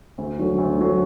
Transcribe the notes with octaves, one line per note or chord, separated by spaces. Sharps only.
D2
D3 F#3 A3
D2
D3 F#3 A3